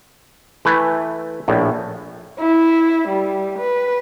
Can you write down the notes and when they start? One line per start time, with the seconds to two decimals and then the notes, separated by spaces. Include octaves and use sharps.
0.65 E3 A3 E4 B4
1.48 A#1 A2
2.39 E4
3.08 G3
3.59 B4